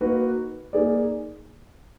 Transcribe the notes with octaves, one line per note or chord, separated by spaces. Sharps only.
A#3 D#4 F#4 B4
A#3 D#4 G#4 D5